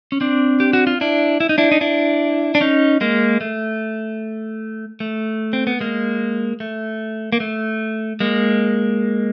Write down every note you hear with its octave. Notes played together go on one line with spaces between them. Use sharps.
C#4
C4 D4
G4
F#4
F4
D4 E4
E4
D#4
D4 E4
D#4
D4 E4
D4
C#4 D#4
G#3 A#3
A3
A3
C4
B3
G#3 A#3
A3
A#3
A3
G#3 A#3